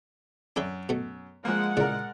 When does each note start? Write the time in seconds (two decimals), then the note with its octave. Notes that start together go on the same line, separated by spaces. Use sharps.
0.56 F#2 D4 A4 E5
0.89 B2 A3
1.45 F3 G#3 A#3 F#5
1.77 A#2 C#3 E4 A#4 D5